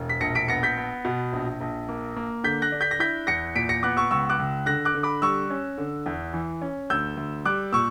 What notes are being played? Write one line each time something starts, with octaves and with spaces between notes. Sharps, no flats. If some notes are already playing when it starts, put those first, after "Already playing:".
Already playing: E1
B6
A#1 A#6 C#7
B6 D7
B3 A#6 C#7
G6 B6
B3
B2
A#1
A#1
A#3
A#3
D3 G6 B6
F#6 A#6
D4
G6 B6
A#6
E4 G6 B6
E2 A#6 C#7
A#2 B6 D7
A#6 C#7
B3 D6 F#6
C#6 E6
C#2 C#6 E6
D6 F#6
C#2
D3 F#6 A#6
D6 F#6
D3
B5 D6
G3 C#6 E6
C#4
D3
E2
E3
C#4
D2 E6 G6
D2
G3 D6 F#6
A#2 C#6 E6